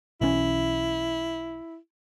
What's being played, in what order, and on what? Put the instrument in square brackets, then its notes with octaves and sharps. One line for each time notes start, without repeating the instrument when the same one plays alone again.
[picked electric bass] B1 E3 C#4 [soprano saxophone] E4